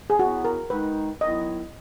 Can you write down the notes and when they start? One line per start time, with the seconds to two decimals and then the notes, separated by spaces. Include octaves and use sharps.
0.10 G#4
0.19 F#3 B3 E4 F#4
0.45 A#4
0.70 D#3 G#3 D#4 B4
1.21 D#3 F#3 B3 E4 D#5